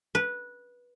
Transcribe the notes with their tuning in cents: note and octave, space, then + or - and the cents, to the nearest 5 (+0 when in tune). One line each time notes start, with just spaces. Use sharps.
B4 -15